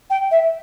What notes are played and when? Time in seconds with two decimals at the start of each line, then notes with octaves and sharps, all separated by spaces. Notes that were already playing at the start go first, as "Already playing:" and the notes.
0.09 G5
0.31 E5